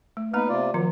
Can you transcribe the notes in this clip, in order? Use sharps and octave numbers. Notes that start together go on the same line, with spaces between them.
A3
A#3 B3 D#4 B4 A#5
C3 F4 D5
D#3 F3 F#3 F4